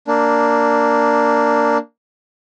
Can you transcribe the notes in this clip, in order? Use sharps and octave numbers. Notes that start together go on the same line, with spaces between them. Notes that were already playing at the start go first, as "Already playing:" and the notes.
A#3 D4